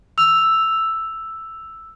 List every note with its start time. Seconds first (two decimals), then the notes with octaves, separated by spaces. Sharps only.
0.18 E6 F7